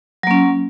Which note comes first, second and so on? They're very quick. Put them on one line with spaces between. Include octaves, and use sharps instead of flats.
F#3 A#3 C#4